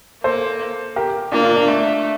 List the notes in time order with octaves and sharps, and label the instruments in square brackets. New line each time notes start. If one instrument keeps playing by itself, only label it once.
[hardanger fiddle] A#3 [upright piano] A4 C5
[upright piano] G4 A#4
[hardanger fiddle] A#3 [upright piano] D4 F4
[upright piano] D4 F4
D4
[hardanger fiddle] A3